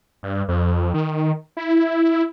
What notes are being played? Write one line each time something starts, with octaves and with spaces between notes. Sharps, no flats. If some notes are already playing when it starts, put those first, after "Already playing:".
G2
F2
D#3
E4